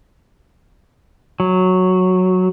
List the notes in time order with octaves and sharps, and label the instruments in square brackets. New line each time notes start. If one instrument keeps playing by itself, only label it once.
[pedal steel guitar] F#3